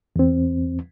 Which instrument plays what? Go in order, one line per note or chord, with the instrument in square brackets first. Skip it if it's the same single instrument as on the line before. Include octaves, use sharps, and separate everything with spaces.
[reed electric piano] E2 C4